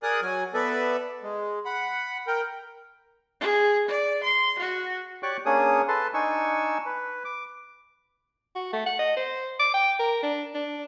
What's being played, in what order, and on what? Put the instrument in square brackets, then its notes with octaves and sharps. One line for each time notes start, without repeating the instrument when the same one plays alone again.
[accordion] G#4 A#4 D5 G#5 D#6 F#6
F#3 G#5
B3 A4 B4 D5 E5
G#3
F#5 B5
A#4 G5
[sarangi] G#4
D5
C6
F#4
[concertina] G4 C#5 D5 C#6 D6 F#6
A#3 C#4 D4 G#4 C#5 D#6
A4 B4 A5 C6
D4 D#4 G#5 C#6 E6
B4
D6
[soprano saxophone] F#4
A3
F#5
D#5
C5
D6
G5
A#4
D4
D4